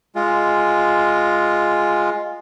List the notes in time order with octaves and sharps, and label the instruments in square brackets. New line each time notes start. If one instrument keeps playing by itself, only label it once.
[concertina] G#3 F4